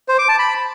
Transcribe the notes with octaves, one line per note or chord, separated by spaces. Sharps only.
C5
D6
A5
B5